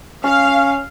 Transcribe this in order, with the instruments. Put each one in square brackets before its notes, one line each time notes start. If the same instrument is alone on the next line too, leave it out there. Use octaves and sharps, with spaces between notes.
[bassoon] C#4 [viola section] F5